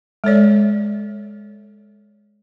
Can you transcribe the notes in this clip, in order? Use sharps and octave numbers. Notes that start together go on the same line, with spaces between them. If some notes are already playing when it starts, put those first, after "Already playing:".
G#3 A4 C#5 D5